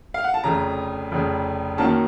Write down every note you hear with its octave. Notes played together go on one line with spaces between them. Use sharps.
F5
F#5
A5
F1 F2 C#3 A#5
F1 F2 C#3
F#2 D#3 A#3 C#4 A5